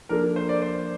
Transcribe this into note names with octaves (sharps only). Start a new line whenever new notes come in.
F3 A#3 D4 F4 A4 A#4
C5
D5
C5